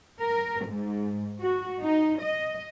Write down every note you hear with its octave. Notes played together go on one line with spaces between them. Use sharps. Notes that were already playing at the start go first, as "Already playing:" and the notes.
A#4
G#2
F#4
D#4
D#5